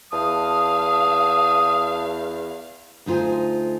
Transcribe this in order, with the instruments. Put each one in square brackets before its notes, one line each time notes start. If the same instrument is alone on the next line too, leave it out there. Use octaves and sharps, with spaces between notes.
[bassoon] E2 [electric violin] F5 [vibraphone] A5 [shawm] D#6
[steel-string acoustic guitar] D2 D#4 F4 C5 G#5